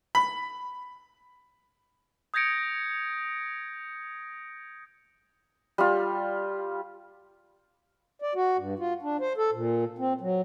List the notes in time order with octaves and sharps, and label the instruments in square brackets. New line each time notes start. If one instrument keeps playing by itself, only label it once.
[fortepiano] B5
[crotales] D#6 G6 G#6 A#6 C#7 D7
[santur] G3 F4
[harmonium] D5
F#4
G2
F4
D4
C5
A4
A#2
C4
F#3